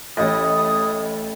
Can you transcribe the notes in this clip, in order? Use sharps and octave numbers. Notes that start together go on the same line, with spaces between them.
A1 A2 D#5 D#6